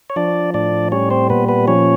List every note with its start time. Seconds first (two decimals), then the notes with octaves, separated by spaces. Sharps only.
0.10 C#5
0.16 F3 D4 D5
0.54 A2 D4 D5
0.92 G3 C#4 C#5
1.10 C4 C5
1.30 A#2 B3 B4
1.49 B3 B4
1.67 F3 C#4 C#5